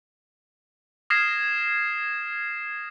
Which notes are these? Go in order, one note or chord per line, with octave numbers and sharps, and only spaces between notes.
D#6 F6 G#6 A#6 C7 E7